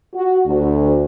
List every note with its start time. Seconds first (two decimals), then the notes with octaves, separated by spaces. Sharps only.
0.14 F#4
0.46 D2